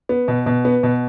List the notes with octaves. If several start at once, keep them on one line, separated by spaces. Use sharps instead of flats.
B3
B2
B2
B3
B2